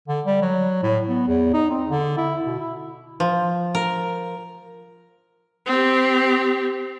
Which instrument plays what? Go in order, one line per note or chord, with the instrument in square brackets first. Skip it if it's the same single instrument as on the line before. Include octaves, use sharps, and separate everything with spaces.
[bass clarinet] D3
G3
F#3
A2
B3
E2
D#4
C4
D3
E4
B2
E4
[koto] F3
A#4
[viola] C4 G4